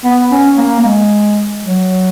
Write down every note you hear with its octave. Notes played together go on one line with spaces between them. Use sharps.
B3
C#4
A#3
A#3
G#3
F#3